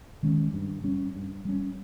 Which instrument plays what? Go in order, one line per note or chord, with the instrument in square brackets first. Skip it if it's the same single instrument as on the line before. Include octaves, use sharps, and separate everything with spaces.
[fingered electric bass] D#3 G#3 C#4
G2
G3 C#4
G2
G3 C#4